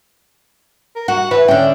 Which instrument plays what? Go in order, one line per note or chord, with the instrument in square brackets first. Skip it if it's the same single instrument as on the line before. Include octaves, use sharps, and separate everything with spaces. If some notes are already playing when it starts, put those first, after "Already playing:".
[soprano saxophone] A#4
[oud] F#4 [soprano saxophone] F#5
[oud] E3 [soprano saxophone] B4
[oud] D3 C#4 [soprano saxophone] G5